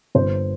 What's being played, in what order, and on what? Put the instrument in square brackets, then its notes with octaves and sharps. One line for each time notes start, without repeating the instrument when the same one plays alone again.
[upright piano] G1 C5